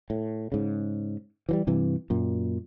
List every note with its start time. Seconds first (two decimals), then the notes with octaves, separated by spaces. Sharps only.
0.10 A2
0.52 G#2 C#3
1.49 E3 F3 G3
1.67 G2 C3 E3
2.10 F#2 A#2